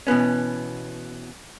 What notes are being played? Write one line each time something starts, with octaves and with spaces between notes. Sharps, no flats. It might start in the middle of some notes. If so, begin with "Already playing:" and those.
B2 E3 B3 C#4